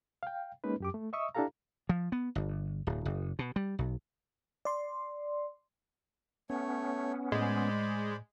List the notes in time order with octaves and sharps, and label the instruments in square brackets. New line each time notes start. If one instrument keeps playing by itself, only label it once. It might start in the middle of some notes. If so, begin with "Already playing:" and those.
[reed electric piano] F5 G5
G#3 A#3 C#4 D#4 B4
F#2 G4 D6
A3
D#5 E5 C#6 D#6 E6
D4 E4 G4 A4 F5 A#5
[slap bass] F3
B3
G1
D1
F#1
B2
G3
B1
[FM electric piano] D5 C6
[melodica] A3 C#5 [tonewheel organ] B3 C#4
[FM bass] A2 [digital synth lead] G#3 [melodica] C5 D5 B5